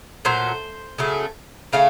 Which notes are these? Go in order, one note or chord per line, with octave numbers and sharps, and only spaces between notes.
A#2 F#3 A3 C5
C#3 F#3 A3
C#3 A3 F5